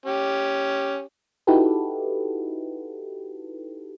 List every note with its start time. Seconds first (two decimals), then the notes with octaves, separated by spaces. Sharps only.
0.06 C#4 G4
1.47 D#4 E4 F#4 G4 A4 B4